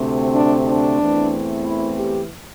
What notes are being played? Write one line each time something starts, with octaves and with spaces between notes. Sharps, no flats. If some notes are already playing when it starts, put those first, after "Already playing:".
Already playing: D2 C3 A3 C4
D4
D4
E2 E3 A3 C4
E4
G4